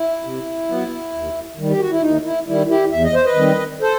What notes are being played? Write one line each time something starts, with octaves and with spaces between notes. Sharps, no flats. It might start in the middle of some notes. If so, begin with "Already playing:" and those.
Already playing: E4
C3
F#3 B3
D#2
D#3 G3
G4
F#4
E4
D#2 D#4
E4
D#3 G3 E4
E4 G4
E2 E5
D#5
C5
B4 D#5
D#3 G3 C4
A4 C5